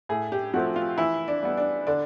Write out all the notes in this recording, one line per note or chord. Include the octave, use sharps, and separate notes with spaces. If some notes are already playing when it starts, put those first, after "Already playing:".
A2 G#4
G4
F3 A3 C4 F#4
F4
E3 E4
D4
G3 B3
D4
D3 D4